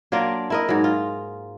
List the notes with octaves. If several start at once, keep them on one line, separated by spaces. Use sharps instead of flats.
F#3 A#3 D4 F4
E4 A#4 D#5
G#2 F#3
F4